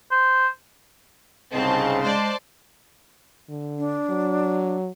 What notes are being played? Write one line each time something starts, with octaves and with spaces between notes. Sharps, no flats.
C5
C2 G#2 C#3 C4 D#5 A5
G#3 C5 D5 A5
D3
D4
F#3